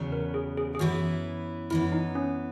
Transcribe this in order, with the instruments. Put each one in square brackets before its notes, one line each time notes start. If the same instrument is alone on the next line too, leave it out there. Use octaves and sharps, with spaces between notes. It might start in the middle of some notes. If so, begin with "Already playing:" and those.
Already playing: [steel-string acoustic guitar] E2 C#3 F#3 B3
[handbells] A#4
G#4
G#4
G#4
[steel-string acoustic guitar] F#2 E3 B3 E4 [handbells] F#4
[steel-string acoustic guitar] F#2 E3 B3 [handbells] E4
[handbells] D#4
C#4